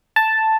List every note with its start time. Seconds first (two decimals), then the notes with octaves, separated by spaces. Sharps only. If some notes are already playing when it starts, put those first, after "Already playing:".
0.16 A5